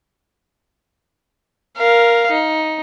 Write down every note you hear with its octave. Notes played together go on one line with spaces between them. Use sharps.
A#4 F5
D#4